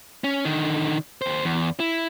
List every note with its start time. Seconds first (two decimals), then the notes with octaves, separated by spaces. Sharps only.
0.24 C#4
0.45 D3 D#3
1.22 D#2 C5
1.45 E2
1.80 E4